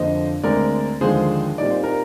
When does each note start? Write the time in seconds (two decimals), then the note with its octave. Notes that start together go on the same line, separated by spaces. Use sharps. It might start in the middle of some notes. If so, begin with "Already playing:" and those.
Already playing: F2 D3 F3 A#3 D4 C5 D#5
0.44 D2 D3 G#3 C4 A#4 D5
1.01 D#2 D3 F3 G#3 G#4 C5
1.58 A#2 G3 C4 D#4 D5
1.70 C5
1.84 A#4